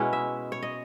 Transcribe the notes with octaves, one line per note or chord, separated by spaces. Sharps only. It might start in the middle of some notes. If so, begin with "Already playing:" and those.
Already playing: B2 G#3 C#4 E4 B4 C#5
E5
C#5
D#5